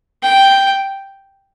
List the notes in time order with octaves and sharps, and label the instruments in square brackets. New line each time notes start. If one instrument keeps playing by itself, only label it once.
[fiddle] G5